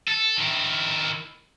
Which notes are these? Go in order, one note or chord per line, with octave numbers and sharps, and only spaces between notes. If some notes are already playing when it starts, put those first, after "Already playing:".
A4
D#3 E4